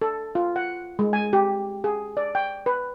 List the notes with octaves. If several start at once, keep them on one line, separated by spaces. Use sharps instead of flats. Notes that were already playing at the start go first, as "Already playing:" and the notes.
A4
F4
F#5
G#3
G#5
G4
G#4
D5
G5
B4